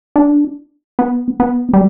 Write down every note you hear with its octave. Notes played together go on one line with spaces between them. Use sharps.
D4
B3
B3
G3